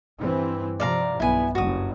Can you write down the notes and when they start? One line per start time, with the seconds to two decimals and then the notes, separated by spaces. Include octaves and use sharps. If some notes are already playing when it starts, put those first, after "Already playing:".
0.18 G2 E3 C4
0.80 C3 F3 D5 F5 A#5
1.20 B1 G2 B3 E4 G#5
1.55 F#1 G2 F#4 D#6